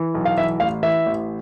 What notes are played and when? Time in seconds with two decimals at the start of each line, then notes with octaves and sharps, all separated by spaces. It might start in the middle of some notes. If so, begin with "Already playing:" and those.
Already playing: E3
0.14 B1
0.25 F5
0.37 E3 E5
0.60 A1 F5
0.83 E3 E5
1.06 A1